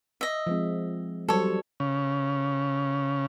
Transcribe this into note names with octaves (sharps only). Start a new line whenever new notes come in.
D#5 E5
F3 G#3 C4
F#3 G3 A4 C5 C#5
C#3